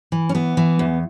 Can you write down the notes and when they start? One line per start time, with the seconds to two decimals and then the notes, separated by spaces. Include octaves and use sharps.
0.12 E3
0.29 C#4
0.34 E3 B3
0.57 E3
0.79 E2